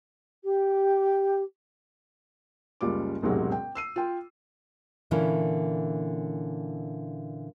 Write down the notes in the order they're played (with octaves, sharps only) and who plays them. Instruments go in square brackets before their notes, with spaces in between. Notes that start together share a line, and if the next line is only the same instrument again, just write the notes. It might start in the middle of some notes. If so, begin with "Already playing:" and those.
[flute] G4
[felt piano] F#1 C#2 G3 F4 D6
E1 A1 G#2 C3 F#3
G5
E6 C7 D#7
F4 G5
[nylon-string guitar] A#2 D3 E3 C#4 E4